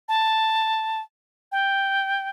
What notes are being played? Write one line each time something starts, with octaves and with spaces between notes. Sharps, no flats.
A5
G5